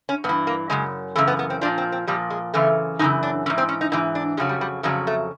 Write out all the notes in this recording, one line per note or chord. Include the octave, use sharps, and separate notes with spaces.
C#4
G2 B3
E3
A#3
F#2 C#3 G#3
F#2 C#3 E3 A3
B3
B3
C4
A#2 F3 D4
C4
C4
A#2 F3 G3
G#3
F#2 C#3 E3 A3
F#2 C#3 E3 D#4
D4
G#2 E3 C#4
C4
C#4
D#4
G#2 E3 D#4
D4
F2 C#3 F#3 G#3
G3
G3
F2 C#3 F#3 G#3
A3